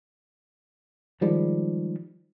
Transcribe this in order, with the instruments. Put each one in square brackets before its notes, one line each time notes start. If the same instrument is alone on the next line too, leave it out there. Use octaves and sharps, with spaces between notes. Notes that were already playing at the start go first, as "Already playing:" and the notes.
[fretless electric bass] D#3 F3 G3 G#3